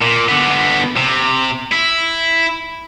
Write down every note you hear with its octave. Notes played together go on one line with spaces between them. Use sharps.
A#2
D3 B3
C3
E4